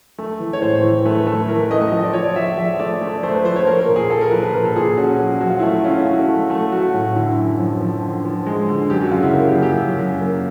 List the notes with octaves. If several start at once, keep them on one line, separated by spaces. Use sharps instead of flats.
A3
E3
C#5
A2 C5
E3
A3 B4
A3
E3 A#4
B4
A3 D#5
D#5
F3 D#5
D5
F3 C#5
D5
F3 E5
F3 E5
A3 D5
A3
A3 C5
B4
F3 C5
C#5
A#3 A#4
A#4
A#2
G#4
A#3 A4
A#4
F3 B4
B4
A#2 A#4
A4
A#2 G#4
C#4 F#4
F3
F#3 F#4
F4
A3 E4
F4
C#4 F4
E4
A3
F#4
A3
A3
F#3 F#4
A2
D3 E4
F#2
F3
F3
D3
F3
G#3
D3
F#2 G4
F#4
C#3 F4
E4
A#3 F4
G4
F#2
G4
F#2
F#2
A#3